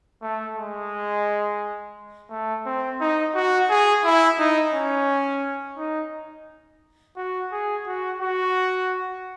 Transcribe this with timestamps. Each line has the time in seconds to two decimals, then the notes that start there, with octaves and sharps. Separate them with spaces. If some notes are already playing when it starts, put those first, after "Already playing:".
0.22 A3
0.56 G#3
2.30 A3
2.66 C4
3.01 D#4
3.35 F#4
3.70 G#4
4.04 E4
4.39 D#4
4.73 C#4
5.77 D#4
7.17 F#4
7.52 G#4
7.87 F#4
8.21 F#4